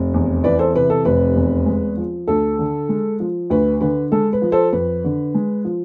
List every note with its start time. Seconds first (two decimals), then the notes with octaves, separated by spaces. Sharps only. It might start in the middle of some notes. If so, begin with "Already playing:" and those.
Already playing: F1
0.14 E2
0.44 E3 B4 D5
0.59 A4 C5
0.75 C3 B4
0.90 A4
1.05 F1 B4
1.36 E2
1.66 G#3
1.97 F3
2.28 D2 A4
2.59 D3
2.89 G#3
3.20 F3
3.50 D2 B4
3.81 D3 B4
4.12 G#3 A4
4.33 B4
4.42 F3
4.52 A4 C5
4.73 F2 B4
5.04 D3
5.34 G#3
5.65 F3